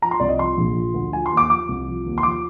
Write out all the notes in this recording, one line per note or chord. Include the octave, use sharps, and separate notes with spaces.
F3 A#5
C6
C2 D5
D#5
F3 C6
A#1
F3
D2
F3 G#5
C6
D#2
D6
F3 D6
C2
F3
D#2
C6
F3 D6